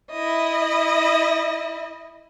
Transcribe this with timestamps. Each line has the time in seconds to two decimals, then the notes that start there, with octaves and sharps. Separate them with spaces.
0.11 E4 D#5